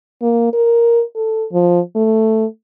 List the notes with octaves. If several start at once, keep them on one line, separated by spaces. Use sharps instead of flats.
A#3
A#4
A4
F3
A3